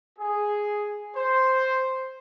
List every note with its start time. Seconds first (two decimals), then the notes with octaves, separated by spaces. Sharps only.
0.19 G#4
1.16 C5